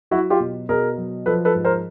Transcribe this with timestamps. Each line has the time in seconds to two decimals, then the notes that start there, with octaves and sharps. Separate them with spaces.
0.11 F#3 E4 F#4
0.30 F4 G4
0.40 B2
0.69 B2 G#4 A#4
0.97 F#3
1.26 F3 A4 B4
1.45 A4 B4
1.55 G#2
1.64 A#4 C5